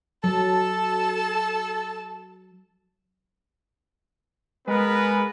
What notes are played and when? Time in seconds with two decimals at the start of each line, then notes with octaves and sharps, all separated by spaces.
0.24 F#3 A4 A5
4.67 G#3 B3 A#4 B4